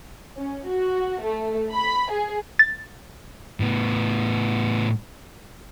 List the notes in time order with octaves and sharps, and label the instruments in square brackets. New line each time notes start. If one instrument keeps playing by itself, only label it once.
[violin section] C#4
F#4
A3
B5
G#4
[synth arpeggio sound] A6
[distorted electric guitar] A2 B3